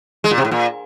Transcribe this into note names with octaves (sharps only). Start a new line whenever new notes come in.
G#3
A#2
C3
A2
A#2